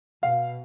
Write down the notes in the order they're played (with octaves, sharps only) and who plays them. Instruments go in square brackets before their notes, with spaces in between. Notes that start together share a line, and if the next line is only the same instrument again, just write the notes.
[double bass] B2 [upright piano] F5